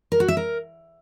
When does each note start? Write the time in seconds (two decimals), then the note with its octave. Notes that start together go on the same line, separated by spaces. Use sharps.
0.12 A#4
0.20 F#4
0.28 E5
0.37 A#4